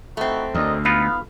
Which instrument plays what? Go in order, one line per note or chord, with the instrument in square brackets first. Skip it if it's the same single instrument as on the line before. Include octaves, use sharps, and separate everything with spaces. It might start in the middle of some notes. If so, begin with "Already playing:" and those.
[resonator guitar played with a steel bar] A3 C4 [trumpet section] D#4 E4 F#4
[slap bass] D2 [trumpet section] A#4 D5 D#5
[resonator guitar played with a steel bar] G#2 [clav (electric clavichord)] B3 D#4 F4 [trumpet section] F5 B5